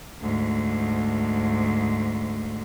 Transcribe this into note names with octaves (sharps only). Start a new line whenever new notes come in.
D2 G#2